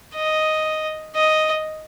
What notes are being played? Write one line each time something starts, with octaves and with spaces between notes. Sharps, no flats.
D#5
D#5